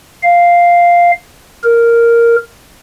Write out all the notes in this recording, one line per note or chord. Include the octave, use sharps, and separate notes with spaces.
F5
A#4